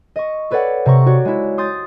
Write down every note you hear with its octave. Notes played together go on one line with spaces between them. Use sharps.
D#5 C#6
A4 B4 C#5 D5 F#5
C3 A#5 C#6
F#4 C#5 D5
G#3 E4
C6 D#6 G6 A6